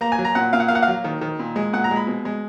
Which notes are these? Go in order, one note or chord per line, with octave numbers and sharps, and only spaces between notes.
A#3 A#5
G#5
F#3
A#5
A#2 F#5
A#2 F5
F#5
A#3 F5
F#5
F5
F#3
D#3
D#3
A#2
G#3
A#2 F#5
A#5
G#3
B5
B2
G#3